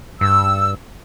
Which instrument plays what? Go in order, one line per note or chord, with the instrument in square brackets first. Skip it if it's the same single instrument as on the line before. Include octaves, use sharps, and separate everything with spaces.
[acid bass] G2 [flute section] E6